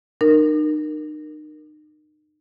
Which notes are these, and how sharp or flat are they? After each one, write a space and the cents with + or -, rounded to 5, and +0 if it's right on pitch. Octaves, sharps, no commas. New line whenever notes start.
D#4 -35 A#4 +0